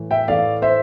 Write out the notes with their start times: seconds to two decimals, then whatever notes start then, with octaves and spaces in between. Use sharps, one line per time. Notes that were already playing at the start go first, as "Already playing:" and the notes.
Already playing: A2 E3
0.11 E5 G5
0.28 A2 E3 A3 D5 F5
0.62 C5 E5